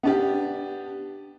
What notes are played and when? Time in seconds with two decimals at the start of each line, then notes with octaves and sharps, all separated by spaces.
0.03 B3 D4 G4